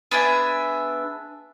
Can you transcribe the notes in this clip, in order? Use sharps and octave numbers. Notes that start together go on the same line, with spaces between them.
B3 D4 G#4 E5